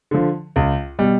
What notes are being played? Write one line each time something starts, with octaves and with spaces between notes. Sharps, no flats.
D3 F3
C#2
B2 G3